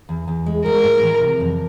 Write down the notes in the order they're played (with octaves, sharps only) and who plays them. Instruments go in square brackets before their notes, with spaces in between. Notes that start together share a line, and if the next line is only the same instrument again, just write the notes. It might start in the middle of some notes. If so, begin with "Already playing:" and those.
[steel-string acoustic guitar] E2
E2
G#3
[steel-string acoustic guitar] G#3 [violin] A#4
[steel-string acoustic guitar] A2
E3
C3
F2